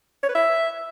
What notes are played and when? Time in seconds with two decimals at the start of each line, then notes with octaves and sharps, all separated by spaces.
0.23 C#5
0.29 B4
0.35 E5